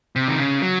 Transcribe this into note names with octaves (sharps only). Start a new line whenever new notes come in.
C3
D#3
C#3
F#3